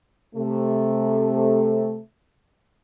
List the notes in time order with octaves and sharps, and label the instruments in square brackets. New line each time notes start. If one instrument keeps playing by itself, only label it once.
[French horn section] C3 A3